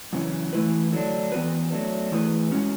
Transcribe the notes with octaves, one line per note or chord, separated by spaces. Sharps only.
F#2 C#3 E3
E3 A3 E4 B4
D3 F#3 A3 D4
E3 B3 F#4 B4
F#3 A3 D4
E3 A3 E4 G#4 B4
B2 G#3 C#4 F#4